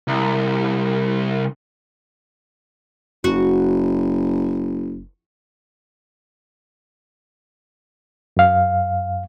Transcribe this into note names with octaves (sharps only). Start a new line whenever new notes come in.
C2
F#1 F#4
F#2 F5